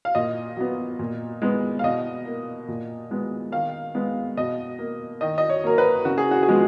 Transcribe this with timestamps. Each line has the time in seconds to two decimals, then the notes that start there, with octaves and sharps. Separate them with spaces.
0.05 F5
0.15 A#2 D#5
0.57 F#3 B3
0.99 A#2
1.42 G#3 B3
1.79 F5
1.83 B2 D#5
2.26 A#3
2.68 A#2
3.11 G#3 B3
3.52 D#3 F5
3.95 G#3 B3
4.37 B2 D#5
4.79 A#3
5.21 D#3 D#5
5.38 D#5
5.50 C#5
5.64 F#3 A#3 A#4
5.78 B4
6.05 C#3 F#4
6.18 G#4
6.31 F#4
6.43 G#4
6.48 F3 G#3 B3